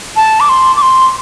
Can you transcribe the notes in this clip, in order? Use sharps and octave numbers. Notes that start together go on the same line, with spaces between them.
A5
D6
C6
D6
C6